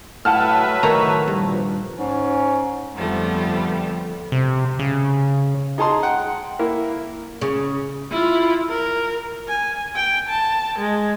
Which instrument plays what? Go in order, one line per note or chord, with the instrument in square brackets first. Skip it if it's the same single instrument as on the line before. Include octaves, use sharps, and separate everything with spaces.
[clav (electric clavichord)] A2 [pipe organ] F#3 B4 E5 [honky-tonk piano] F#5 A5 F6
[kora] A2 D#3 C#5 [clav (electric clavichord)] A#5
[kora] G2 [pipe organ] A#2 F3
[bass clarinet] G#2 [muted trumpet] C#4
[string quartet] F2 D3 F3 G3 A3 B3
[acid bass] C3
C#3
[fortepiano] D#4 G#4 A5 A#5 C6
F#5 G5
A#3 E4
[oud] C#3
[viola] E4 F4
A#4
G#5
G5
A5
G#3